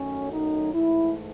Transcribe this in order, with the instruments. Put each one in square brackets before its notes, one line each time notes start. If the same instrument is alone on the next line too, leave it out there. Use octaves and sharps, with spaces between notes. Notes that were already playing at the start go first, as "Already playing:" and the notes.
Already playing: [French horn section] F#2 D#3 F#3 A3 C#4
D#4
G#2 E3 A3 E4